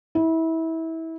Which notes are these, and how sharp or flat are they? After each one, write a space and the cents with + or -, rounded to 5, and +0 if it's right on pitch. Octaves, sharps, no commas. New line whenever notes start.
E4 -25